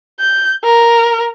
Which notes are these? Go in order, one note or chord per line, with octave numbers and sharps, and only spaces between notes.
G6
A#4